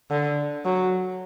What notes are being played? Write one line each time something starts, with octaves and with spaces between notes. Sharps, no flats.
D3
F#3